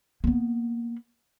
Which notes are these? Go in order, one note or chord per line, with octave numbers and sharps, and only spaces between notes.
A#3 B3